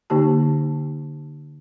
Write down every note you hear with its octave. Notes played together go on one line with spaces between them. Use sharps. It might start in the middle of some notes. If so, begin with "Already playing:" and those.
D3 A#3 D#4 G4 A5